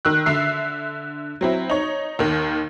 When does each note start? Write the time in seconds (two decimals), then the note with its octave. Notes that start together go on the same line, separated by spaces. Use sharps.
0.05 D#3 E6 F#6
0.26 D3 E5 C7
1.41 F#3 C4 E4
1.70 D#4 C#5
2.19 D#2 D#3